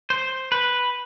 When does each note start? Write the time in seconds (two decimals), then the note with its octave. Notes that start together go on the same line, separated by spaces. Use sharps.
0.10 C5
0.52 B4